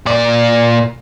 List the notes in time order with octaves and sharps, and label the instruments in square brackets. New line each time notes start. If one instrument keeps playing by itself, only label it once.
[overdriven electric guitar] A#2 D5